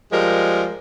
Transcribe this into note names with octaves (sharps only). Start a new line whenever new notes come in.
F3 G3 G#3 A#4